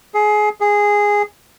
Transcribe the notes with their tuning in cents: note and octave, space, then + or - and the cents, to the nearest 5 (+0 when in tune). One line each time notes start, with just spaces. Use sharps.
G#4 +20
G#4 -10